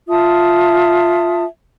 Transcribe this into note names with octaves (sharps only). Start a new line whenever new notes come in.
F4 E5 A5 D#6